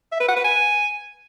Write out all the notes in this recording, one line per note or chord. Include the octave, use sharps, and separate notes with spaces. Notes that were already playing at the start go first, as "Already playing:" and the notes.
E5
B4
F#5
B4
G#5